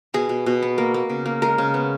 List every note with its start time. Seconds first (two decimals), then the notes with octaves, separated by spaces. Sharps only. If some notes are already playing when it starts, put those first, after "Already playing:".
0.14 B2 G#4
0.29 B2
0.46 B2
0.62 B3
0.78 A#3
0.94 A#3
1.09 C#3
1.26 A#3
1.42 G#3 A#4
1.58 C#3
1.74 B3